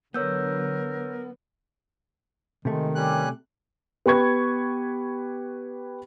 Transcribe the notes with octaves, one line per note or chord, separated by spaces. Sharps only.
D3 F#3 B3 A#4 C#5 E6 G6
C3 D#3 G#3 A3
G3 C#4 G4 G#5 F#6
B3 G4 B4 C#6 G#6